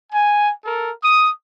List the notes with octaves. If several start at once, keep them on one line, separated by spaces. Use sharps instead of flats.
G#5
A4 A#4
D#6